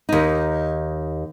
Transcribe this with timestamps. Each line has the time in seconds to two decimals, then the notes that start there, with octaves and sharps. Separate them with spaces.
0.09 D#2 D#4